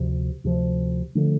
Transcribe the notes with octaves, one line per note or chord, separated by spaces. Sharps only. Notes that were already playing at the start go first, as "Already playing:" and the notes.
Already playing: D2 C3 F3
D2 C3 F3
D3 F3 A3